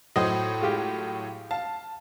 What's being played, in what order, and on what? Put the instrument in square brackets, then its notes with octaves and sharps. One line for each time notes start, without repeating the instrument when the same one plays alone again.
[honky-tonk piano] A2 F#3 [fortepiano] C5 D#5
[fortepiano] G#3 F4 G4
[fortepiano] F5 [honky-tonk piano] A5